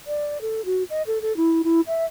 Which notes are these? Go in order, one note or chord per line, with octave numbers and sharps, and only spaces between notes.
D5
A4
F#4
D#5
A4
A4
E4
E4
E5